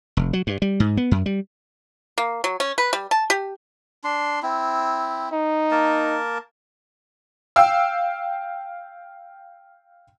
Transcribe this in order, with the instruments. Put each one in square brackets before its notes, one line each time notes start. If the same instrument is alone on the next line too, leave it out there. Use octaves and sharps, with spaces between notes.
[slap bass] F1
F#3
G2
G3
G#2
B3
F#2
G3
[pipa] A#3
F#3
C#4
B4
G3
A5
G4
[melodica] D4 C6
C4 E4
[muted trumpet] D#4
[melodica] A#3 A#4 A5
[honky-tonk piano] F5 G5 E6